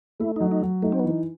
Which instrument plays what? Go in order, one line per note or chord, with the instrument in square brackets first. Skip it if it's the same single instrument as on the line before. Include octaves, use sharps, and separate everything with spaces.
[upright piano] A3 [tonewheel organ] E4
[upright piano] F#3 [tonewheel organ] D#4
[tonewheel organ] D#4
[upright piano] F#3
[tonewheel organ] A3 [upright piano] D#4
[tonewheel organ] C4
[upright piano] E3 [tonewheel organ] B3